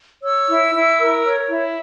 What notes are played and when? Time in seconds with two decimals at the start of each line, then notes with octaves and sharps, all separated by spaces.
0.24 C#5 E6
0.49 E4
0.74 E4
0.99 A#4
1.24 C#5
1.49 E4